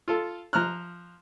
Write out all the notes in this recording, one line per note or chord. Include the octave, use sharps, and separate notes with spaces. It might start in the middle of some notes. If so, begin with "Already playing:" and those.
F4 A4
F3 A#5 F6 F#6